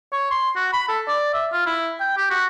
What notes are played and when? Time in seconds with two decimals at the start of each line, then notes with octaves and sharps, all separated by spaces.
0.13 C#5
0.31 C6
0.56 F#4
0.73 B5
0.88 A4
1.08 D5
1.34 E5
1.53 F4
1.66 E4
2.00 G5
2.17 G4
2.30 F#4